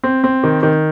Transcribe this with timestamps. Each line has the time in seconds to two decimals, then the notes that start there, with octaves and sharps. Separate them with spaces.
0.04 C4
0.24 C4
0.44 D#3
0.63 D#3